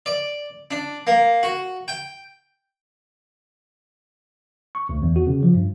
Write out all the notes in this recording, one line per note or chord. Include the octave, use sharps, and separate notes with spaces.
D5
D4
A#3
F#4
G5
C#6
D2
E2
F#4
C#3
F3
G2